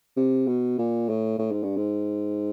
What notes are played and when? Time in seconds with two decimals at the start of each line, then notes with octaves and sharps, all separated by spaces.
0.17 C3
0.47 B2
0.78 A#2
1.09 A2
1.38 A2
1.51 G#2
1.63 G2
1.76 G#2